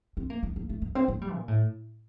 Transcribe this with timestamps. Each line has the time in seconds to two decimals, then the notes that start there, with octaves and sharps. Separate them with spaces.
0.17 C4
0.30 A#3
0.43 A#3
0.56 A#3
0.69 A3
0.82 A#3
0.95 C4
1.08 A#3
1.22 G3
1.34 A#2
1.48 A2